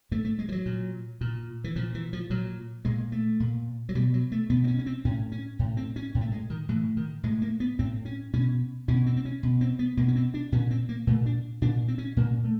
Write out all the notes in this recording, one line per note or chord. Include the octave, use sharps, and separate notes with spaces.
A2 A3
A3
G#3
F3
F#3
A#2
A#2
E3
A#2 F3
E3
F3
A#2 F#3
A#2 G#3
A3
A#2
F#3
B2 G3
F#3
A3
B2 B3
C4
C#4
C#4
C4
A2 C#4
C#4
A2
C4
C#4
A2
A3
G#3
D#3
A2 E3
D#3
A2 G#3
A#3
B3
A2 C4
C#4
B2 C#4
B2 C#4
C4
C4
C#4
B2
C4
B3
B2 A#3
C#4
C4
D4
A#2 C#4
C4
A#3
A#2 A3
D4
A#2 D4
C4
C#4
A#2 A#3
A3